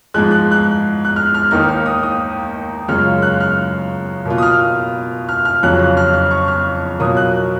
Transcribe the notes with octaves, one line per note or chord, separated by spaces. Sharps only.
G#2 F3 G#3 F#6
F#6
F#6
F#6
F6
F6
D#2 D#3 A#3 D#4 F6
F6
D#6
D#6
F#2 C#3 G#3 C#4 F4 F6
F#6
F6
B2 A#3 F4
D#6
F6
F6
F6
F2 C#3 F#3 C#4 F4 F#6
F#6
F6
F6
C#6
F6
B2 F#3 A#3 F4 D#6
F#6